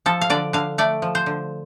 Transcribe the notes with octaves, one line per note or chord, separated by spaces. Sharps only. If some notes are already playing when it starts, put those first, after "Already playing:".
F3 A4
F5
D3 D5
D3 F5
A3 D5
F3
C5
D3